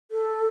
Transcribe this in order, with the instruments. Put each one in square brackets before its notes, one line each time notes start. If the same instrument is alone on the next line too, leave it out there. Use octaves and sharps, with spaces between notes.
[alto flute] A4